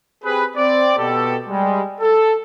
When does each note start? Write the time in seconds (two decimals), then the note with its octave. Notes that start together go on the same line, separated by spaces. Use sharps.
0.24 C4 G4 G#4 B4
0.57 C4 D5
0.97 B2 G4 A4
1.49 G3 G#3
2.00 A4